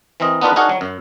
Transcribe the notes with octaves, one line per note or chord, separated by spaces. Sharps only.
E3 C4 A#4 D#5
B3 D4 D#4 F4 A#4 B4
D4 D#4 F#4 G#4 A#4 F#5
F#3
F#2